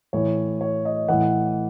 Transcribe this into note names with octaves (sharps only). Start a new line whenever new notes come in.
A2 E3 C#5
C#5
D#5
A2 E3 F#5